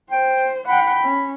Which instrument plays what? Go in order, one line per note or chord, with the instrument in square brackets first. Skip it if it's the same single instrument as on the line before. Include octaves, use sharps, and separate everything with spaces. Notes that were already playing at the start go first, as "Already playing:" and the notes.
[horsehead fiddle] C5 [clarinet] G5
[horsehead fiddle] F#5 G5 [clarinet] B5
[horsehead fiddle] C#4